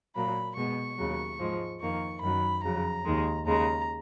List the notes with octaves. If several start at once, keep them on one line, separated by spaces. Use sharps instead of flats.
A#2 F#3 A#3 B5
B2 G#3 B3 C#6
D#2 C#3 F#3
G#2 F3 G#3
F2 D#3 A#3 C#6
F#2 D#3 F#3 B5
F2 C#3 F#3 A#5
D#2 D#3 G#3
D#2 C#3 G#3 A#5